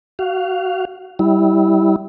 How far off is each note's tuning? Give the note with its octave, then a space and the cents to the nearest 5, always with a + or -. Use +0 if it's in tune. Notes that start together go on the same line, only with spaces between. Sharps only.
F#4 +20 F5 +0
G3 -10 E4 -20